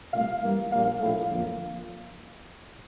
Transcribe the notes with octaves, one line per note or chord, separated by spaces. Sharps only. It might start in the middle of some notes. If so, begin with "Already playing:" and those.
C2 A#2 A3 F5
G2 E3 G3 A#3
A#1 A#2 G3 A#3 F5
A#1 A2 F3 A3 F5
F2 D3 F3 A#3